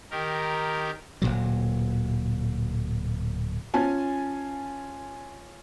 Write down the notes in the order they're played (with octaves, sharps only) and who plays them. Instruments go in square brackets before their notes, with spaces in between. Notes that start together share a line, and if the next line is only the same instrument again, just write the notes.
[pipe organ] D#3 G4 A#4
[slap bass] D1 D#2 A#2 F#3
[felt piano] C#4 F4 G#5 A5